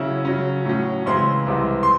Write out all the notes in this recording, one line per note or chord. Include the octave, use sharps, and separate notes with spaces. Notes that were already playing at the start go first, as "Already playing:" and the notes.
Already playing: C#3 F#3 C#4 E4
C#3 F#3 C#4
A2 F#3 C#4
C#3 E3 G#3 C4 E4 C6
C2 C3 E3 G#3
C6